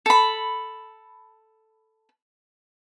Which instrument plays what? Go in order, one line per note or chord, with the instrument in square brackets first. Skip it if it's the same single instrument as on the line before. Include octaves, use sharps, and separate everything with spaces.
[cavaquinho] A4 B5